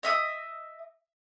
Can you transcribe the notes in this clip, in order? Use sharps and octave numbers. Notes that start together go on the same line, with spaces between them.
D#5 E5 D#6